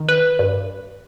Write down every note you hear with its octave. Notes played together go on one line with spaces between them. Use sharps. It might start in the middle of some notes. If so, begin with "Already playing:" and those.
Already playing: D#3
B4
G2